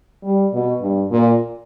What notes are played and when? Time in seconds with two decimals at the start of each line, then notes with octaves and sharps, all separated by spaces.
0.24 G3
0.53 B2
0.81 G2
1.11 A#2